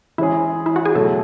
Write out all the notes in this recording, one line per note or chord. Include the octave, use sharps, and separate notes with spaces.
E3 G#3 C#4 E4 G#4
E4
F#4
G#4
B2 F#3 A3 A4